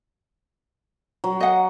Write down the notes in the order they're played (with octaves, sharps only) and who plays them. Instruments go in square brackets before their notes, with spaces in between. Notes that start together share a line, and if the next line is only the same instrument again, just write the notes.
[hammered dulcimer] F#3
[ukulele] D#5 F#5